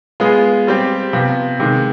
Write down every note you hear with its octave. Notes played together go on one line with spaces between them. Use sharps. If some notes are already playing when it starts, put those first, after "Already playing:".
G#3 B3 F4 G#4
G3 C4 G4
C3 F3 B3
C3 D#3 G#3